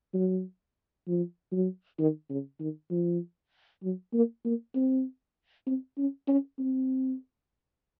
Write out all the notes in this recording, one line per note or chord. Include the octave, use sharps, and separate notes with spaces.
F#3
F3
F#3
D#3
C#3
D#3
F3
F#3
A#3
A#3
C4
C4
C#4
C#4
C4